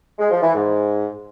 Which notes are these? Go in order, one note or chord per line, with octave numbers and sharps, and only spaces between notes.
G#3
F3
E3
G#2